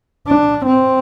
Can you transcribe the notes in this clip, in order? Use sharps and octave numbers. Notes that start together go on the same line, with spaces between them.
D4
C4